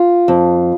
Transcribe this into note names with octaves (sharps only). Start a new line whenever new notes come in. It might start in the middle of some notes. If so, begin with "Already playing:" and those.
Already playing: F4
F2